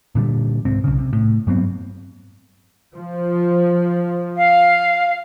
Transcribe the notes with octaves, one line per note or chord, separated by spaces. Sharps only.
A#2 D3 G3
C2 G#2 C4
B1 C#3
C3
A2
G2 F#3 B3 C4
F3
F5